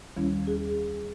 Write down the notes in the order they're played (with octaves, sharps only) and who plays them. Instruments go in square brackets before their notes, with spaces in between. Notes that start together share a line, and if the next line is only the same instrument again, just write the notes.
[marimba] D#2 D#3 G3 C#4 E4
G#4